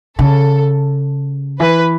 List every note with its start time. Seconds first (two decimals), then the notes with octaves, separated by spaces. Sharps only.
0.19 C#3 A4
1.60 E3 B4